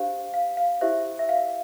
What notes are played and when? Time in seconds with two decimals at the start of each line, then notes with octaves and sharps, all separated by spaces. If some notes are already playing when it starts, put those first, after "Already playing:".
Already playing: D4 G4 C5 F5
0.34 F5
0.57 F5
0.81 E4 G4 C5 E5
1.19 E5
1.29 F5